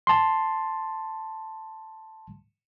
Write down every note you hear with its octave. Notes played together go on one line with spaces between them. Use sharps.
A5 C6